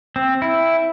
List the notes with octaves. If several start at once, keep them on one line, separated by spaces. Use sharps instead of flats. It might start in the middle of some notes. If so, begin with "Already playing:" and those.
C4
E4